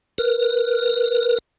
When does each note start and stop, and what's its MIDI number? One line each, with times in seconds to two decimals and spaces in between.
0.18 1.38 70
0.18 1.38 71